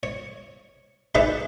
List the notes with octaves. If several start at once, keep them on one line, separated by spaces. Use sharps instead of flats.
C#5
D#4 G#4 B4 C#5 D5 E5